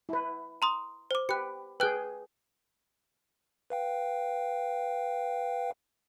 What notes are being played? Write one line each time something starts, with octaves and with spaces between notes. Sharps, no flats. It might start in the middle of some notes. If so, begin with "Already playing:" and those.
E4 B4
A#5 C6 D#6
C5 D6
G4 B4 F#6 C#7
G#4 B4 G5 F#6
B4 F5 G5